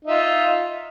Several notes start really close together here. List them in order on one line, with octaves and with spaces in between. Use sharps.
D#4 E5 F4